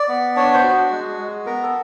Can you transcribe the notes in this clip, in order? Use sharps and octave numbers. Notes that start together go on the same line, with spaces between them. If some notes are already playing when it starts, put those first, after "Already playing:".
Already playing: D5
B3
D4 C#5
C5
F#4
G#3
G#3
B3 A#4
A4